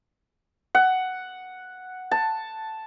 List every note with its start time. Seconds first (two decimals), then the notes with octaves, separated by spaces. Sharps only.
0.75 F#5
2.11 A5